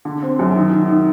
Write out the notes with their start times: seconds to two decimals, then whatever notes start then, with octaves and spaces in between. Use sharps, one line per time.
0.05 D3
0.22 C4
0.39 F#2
0.56 D#3
0.72 D#3
0.89 D#3